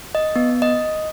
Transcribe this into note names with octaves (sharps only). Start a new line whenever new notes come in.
D#5
B3
D#5